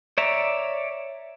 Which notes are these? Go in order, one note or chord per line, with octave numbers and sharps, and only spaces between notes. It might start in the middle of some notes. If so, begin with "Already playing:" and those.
C#5 D5 E5 A#5